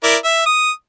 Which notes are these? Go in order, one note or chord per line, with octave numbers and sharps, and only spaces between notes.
E4 A#4 D5
E5
D#6